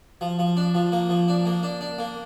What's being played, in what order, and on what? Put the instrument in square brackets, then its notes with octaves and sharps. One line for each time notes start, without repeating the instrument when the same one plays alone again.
[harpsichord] F3
F3
D4
F3
A#3
F3
D4
A#3
D4
D4
A#3